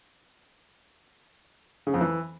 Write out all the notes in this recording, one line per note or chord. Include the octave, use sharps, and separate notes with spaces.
C#3
F2
E3